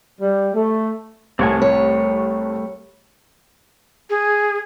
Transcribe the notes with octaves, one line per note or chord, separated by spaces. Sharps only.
G3
A3
C2 A2 C4 C#5 G#5
G3 A3 C#5
G#4